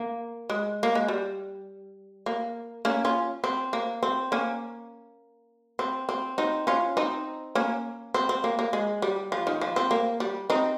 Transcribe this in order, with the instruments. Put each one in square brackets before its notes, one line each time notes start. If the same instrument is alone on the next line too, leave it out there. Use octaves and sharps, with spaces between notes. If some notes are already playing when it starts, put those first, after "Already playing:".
Already playing: [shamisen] A#3
G#3
A#3
G#3
G3
A#3
A#3 C#4
C#4 F4
C4
A#3
C4
A#3 C#4
C4
C4
C4 D#4
C#4 F4
C4 D#4
A#3 C#4
C4
C4
A#3
A#3
G#3
G3
F3
D#3
F3
C4
A#3
G3
C4 D#4